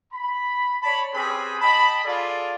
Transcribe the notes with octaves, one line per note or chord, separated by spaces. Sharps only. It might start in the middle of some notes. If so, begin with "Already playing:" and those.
B5
C#5 D5 A5 B5
C4 C#4 G4 G#4 B4 B5
D#5 G5 A5 B5
F4 G#4 A4 D5